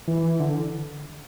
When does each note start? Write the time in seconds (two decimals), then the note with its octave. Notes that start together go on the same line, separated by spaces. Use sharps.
0.08 E3
0.40 D3